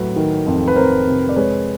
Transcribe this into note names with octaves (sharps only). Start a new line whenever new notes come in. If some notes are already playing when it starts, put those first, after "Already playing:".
Already playing: A2 F#3 B4
D#3
F2
B4
F2 A#4 C5
C3
D5
G#3 B4 C#5